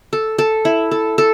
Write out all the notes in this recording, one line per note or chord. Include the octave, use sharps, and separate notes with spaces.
A4
A4
E4
A4
A4